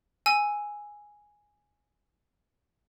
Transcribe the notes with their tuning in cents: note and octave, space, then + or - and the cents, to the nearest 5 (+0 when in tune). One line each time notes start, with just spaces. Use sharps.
G#5 +0 E6 +0